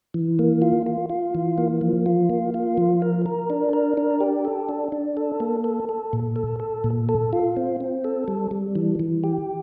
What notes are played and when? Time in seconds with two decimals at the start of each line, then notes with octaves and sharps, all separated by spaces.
0.14 E3
0.39 A#3
0.62 F4
0.86 F4
1.10 F4
1.35 E3
1.58 A#3
1.81 F3
2.06 F4
2.29 A#3
2.54 F4
2.78 F3
3.02 A#4
3.26 A#4
3.50 D4
3.73 A#4
3.97 D4
4.20 G4
4.45 A4
4.69 D4
4.92 D4
5.17 A4
5.40 A#3
5.64 A4
5.89 A4
6.13 A#2
6.36 A4
6.60 A4
6.84 A#2
7.09 A4
7.33 F4
7.57 C4
7.80 C4
8.04 A4
8.28 G3
8.51 G3
8.75 E3
8.99 E3
9.24 G4